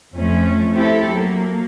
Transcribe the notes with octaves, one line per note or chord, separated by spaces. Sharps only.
F2 A3 C#4
C4 E4 G4 A4
F#3 A#3